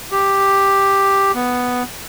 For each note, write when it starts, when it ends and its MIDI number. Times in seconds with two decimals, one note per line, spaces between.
0.11 1.32 67
1.35 1.83 59